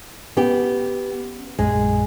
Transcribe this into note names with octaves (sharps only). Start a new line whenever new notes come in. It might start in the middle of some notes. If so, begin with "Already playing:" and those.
B3 C#4 G4
A#1 F#2 G#3